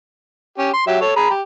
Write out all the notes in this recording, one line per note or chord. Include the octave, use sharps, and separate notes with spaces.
C#4 G4
C6
F#3 G4 E5
A4 C#5
G#4 A#5 B5
G4